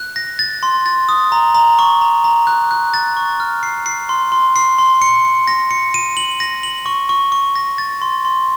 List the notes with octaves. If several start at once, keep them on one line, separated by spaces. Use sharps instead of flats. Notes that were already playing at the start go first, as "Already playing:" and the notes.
Already playing: F#6
A#6
A6
C6
A6
D#6
A#5
A#5
C#6
A#5
A#5
F#6
F#6
A6
C#6
F6
C7
C7
C6
C6
C7
C6
C#7
C#7
A#6
C#7
D#7
F#7
A#6
F#7
C#6
C#6
C#6
A#6
A6
C6
C6